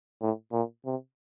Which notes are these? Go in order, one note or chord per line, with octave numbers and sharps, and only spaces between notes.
A2
A#2
C3